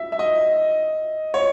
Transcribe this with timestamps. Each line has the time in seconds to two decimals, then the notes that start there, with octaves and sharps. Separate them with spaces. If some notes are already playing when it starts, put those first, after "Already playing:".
Already playing: E5
0.12 E5
0.19 D#5
1.34 C#5